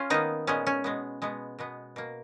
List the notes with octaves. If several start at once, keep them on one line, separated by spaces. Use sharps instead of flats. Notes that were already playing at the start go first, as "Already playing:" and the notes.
Already playing: C#4 F4
D#3 A#3 B3 D#4
A#2 G#3 B3 C#4
C#4
B2 G#3 B3
B2 G#3 B3
B2 G#3 B3
B2 A#3